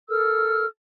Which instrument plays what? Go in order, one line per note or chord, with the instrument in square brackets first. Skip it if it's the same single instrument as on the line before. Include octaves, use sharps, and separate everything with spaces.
[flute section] A4 A#4 E6 F6